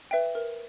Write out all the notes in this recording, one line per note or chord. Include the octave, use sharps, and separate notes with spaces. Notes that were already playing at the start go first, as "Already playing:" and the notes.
B4 E5 G5
A#4